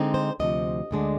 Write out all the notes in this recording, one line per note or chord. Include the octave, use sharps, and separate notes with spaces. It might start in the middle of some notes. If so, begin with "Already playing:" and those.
Already playing: D3 G#3 C4 D#4
C5
D2 C3 F3 D#5
D2 D3 G#3 D4